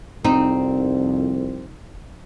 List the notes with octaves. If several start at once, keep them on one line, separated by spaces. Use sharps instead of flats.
C2 F2 C4 D#4